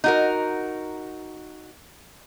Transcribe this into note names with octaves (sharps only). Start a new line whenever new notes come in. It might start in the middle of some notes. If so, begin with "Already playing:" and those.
D#4 F#4 A#4